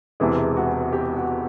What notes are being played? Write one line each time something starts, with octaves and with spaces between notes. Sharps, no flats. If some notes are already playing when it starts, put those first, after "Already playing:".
E1 E2 C3 E3 G#3
F#4
G4
F#4